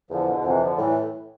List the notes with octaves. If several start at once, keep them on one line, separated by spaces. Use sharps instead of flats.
E2 D3 F3
B2 D3
F2 C3 E3
D3 F3
A2 E3 G3